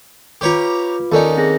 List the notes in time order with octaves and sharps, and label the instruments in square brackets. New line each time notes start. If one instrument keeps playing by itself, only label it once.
[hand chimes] F4 B4 D6 [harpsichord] G4 C#5 A#5
[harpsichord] D#2 C#4 D#4 [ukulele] A4 D5
[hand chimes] C4 G#4 A#6